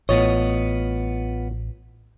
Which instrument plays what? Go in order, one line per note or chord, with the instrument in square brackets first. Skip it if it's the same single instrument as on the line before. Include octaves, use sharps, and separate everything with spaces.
[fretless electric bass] A1 A2 [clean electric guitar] B3 F4 D#5 [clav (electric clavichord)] C#5